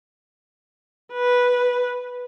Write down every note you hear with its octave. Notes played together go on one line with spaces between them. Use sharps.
B4